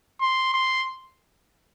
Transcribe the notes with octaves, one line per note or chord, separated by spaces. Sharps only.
C6
C6